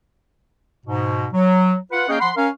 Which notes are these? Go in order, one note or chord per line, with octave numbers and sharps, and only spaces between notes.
G#2 B2
F#3
F4 B4 F#5
A#3 C#4 G#4 D#5 F5 G5
F3 F#5 B5 C6
C#4 A#4 F5